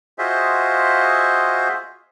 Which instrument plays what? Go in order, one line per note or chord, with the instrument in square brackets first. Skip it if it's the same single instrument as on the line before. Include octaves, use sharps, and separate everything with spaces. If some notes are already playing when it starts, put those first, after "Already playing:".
[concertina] F4 F#4 G#4 C5 D#5 E5